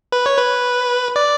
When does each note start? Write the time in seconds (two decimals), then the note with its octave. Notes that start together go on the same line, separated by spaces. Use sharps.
0.12 B4
0.26 C#5
0.38 B4
1.16 D5